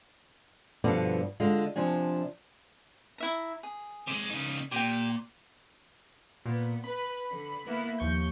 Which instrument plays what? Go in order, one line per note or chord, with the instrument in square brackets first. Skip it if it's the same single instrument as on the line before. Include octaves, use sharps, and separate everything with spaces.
[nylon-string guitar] G2 B2 D3 F3 B3 D5
D3 G#3 F4
C3 F3 D4 G#5
[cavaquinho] E4 E5 A#5
G#4
[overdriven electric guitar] C3 G#3
C#3 D#4
[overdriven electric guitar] A#2 [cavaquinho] G4 G5
[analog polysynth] A#2 [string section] B3
[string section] B4 [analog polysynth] B5
[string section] D3
A#3 B3 E4
[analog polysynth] D#2 C#6 G6 [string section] F3